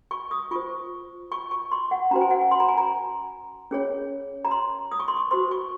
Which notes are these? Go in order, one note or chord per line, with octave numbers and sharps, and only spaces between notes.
C#6
D#6
F4 C5 C#6
C#6
C#6
C6
F#5
C#4 F#4 C5 A#5
G#5
F#5
G#5
C6
A#5
G#5
A#5
C#4 G#4 C#5
A#5
C6
D#6
C#6
C6
C#6
F#4 C5 C6
C#6